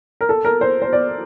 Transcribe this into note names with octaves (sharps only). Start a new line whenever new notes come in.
A#4
A4
A#4
C5
C5
D5